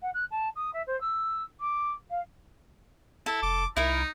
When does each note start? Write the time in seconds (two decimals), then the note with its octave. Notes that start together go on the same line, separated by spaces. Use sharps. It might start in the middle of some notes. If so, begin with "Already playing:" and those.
0.02 F#5
0.14 F#6
0.30 A5
0.55 D#6
0.73 E5
0.86 C5
1.00 E6
1.60 D6
2.10 F5
3.26 E4 A4
3.43 F1 D6
3.76 C2 D#4 E4 A#4